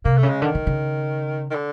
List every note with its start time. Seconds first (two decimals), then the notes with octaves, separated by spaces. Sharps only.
0.05 C3 A#3
0.17 A3
0.23 C#3
0.30 G#3
0.42 D3 D#3
0.55 D3
0.67 C#3
1.50 D#3
1.55 D3